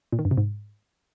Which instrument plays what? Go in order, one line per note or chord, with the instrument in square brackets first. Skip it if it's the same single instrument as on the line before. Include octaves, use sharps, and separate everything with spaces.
[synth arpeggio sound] A#2
D#3
G2
C3
G#2